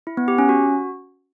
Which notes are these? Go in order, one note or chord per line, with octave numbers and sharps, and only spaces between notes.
E4
B3
G4
C#4
F#4